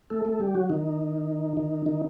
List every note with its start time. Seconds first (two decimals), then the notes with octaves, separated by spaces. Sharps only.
0.10 A3 A4
0.25 A3 A4
0.40 G3 G4
0.55 F#3 F#4
0.70 D#3 D#4
1.57 D#3 D#4
1.86 D#3 D#4